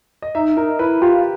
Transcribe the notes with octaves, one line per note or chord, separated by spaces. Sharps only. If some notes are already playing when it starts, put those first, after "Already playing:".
D#5
D#4 E5
D#4 A#4
E4 B4
F4 G4